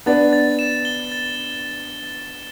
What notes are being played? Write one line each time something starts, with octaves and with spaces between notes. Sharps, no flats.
B3 D4 A6
A6
E7
G7
A6